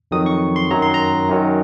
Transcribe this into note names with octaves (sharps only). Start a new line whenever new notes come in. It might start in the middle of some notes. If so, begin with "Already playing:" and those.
F2 D#3 F#3 D#6
C#6
C6
F#2 D#3 F#3 A#5
C6
A#5
F#2 D#3 F#3